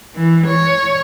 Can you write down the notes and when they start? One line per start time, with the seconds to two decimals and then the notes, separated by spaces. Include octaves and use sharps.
0.15 E3
0.47 C#5